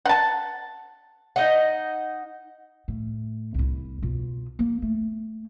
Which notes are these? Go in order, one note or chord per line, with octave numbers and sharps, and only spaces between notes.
F#5 A5
D#4 D#5 F#5
A2
C2 E4
B2 F4
A#3
A3